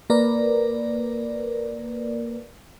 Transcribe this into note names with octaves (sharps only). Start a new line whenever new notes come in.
A#3 A#4 B4 D5